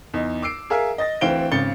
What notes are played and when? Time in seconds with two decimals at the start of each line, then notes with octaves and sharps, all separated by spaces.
0.14 E2 D#4
0.42 D6 E6 C7 D7
0.70 G#4 A#4 E5 F5 G#5
0.98 D#5 A6 A#6
1.21 D2 E3 C4 F5 D7 G7
1.52 G#1 C#3 A6 C#7 G7